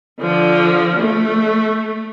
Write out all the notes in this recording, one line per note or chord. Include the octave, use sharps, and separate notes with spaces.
D3 F3
A3